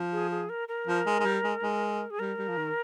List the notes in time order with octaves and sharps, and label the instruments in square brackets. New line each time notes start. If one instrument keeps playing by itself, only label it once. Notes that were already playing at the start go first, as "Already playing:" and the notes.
Already playing: [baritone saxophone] F3
[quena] G#4
G#4
A#4
A#4
[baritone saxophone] F3
G#3
G#3
G3
G#3
G#3
[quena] G#4
[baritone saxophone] G3 [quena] A#4
[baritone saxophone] G3
F3
D#3